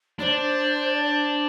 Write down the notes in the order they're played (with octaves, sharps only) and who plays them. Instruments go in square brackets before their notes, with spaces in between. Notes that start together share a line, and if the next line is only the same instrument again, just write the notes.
[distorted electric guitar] D4 [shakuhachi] C5 D5
[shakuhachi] D5
C5